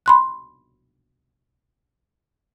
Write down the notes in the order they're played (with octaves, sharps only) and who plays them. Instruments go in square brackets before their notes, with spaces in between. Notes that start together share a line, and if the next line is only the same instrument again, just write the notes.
[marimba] B5 C6 F#6